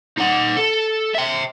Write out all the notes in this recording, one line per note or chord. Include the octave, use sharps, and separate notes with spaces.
D#4 F#5
A4
E5 G5